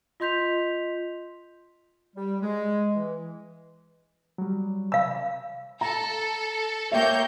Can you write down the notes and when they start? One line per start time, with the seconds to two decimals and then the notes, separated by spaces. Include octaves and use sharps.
0.20 F4 D#5 C6 G6 B6 F7
2.16 G3
2.42 G#3
2.94 E3
4.38 F#3 G3
4.92 C3 F5 B5 E6
5.81 A4 A#5
6.92 A#3 C#5 E5 G5 G6